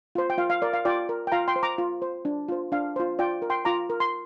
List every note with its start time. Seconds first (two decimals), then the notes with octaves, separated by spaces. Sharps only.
0.15 F4 C5
0.30 G5
0.38 F4 F5
0.50 F5
0.62 A#4 D5
0.73 F5
0.85 F4 D5 G5
1.09 A#4
1.27 G5
1.32 F4 F5 A#5
1.48 G5 C6
1.56 C5
1.63 A#5 D6
1.78 F4
2.02 C5
2.25 D4
2.49 F4 C5
2.72 D4 F5
2.96 F4 C5
3.19 F4 D5 G5
3.42 A#4
3.50 G5 C6
3.65 F4 A#5 D6
3.90 A#4
4.00 C6